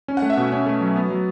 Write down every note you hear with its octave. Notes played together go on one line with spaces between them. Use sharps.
C#4
F#5
A3
E5
B2
C#4
A3
F#3
B3
F#3